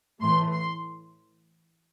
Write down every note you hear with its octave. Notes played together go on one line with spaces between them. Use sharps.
A2 E3 A3 C6
C6